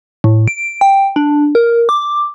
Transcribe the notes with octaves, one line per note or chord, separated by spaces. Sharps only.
A2
D7
G5
D4
A#4
D6